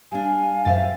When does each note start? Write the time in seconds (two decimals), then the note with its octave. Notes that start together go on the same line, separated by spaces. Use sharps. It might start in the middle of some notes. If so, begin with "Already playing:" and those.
0.12 G3 D4 F5 G#5
0.65 F#2 C5 E5 F5 G5 A6